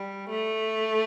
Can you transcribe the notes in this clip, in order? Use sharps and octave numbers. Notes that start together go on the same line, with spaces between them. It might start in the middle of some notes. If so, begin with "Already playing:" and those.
Already playing: G3
A3